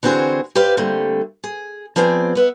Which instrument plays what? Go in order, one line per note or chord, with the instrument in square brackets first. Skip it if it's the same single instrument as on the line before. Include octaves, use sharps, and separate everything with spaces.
[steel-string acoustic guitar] D3 E3 C4 F#4 G#4 C5
G4 B4 C5 D5 F5
D3 G3 A3 A#3 C4
G#4
F3 B3 C4 G#4 D5
B3 B4 E5